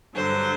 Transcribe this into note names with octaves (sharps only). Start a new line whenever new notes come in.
G2 D3 F#3 C5